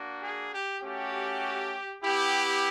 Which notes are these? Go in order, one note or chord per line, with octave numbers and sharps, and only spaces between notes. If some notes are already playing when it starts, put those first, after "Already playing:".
Already playing: A#3 D4 F#4
G#4
G4
A3 C#4 F#4 G4
B3 E4 G4